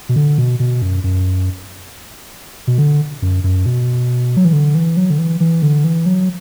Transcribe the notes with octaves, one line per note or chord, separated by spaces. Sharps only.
B2
D3
B2
B2
F#2
F#2
B2
D3
F#2
F#2
B2
F#3
E3
D3
E3
F#3
D3
E3
E3
D3
E3
F#3